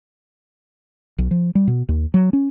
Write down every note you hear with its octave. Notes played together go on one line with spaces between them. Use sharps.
B1
F3
G3
B2
D#2
F#3
C#4